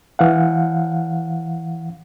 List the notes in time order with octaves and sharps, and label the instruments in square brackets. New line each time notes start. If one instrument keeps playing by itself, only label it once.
[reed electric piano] E3 F5 F#5